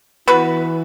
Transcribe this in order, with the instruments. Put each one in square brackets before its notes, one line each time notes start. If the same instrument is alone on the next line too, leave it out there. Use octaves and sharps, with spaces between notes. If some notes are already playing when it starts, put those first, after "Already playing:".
[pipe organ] E3 [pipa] B3 F#4 B4